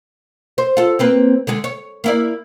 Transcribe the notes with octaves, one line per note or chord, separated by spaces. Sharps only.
C5
F4 A4
A#3 C4 B4
D3 G#3 G#4
C#5
A#3 E4 D5